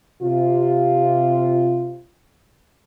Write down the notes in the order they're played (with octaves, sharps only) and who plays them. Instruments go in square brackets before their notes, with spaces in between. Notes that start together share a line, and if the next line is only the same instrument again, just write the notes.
[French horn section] C3 F4